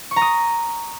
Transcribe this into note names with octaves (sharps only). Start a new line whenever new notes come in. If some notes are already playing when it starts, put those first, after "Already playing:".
C#6
A#5
D#6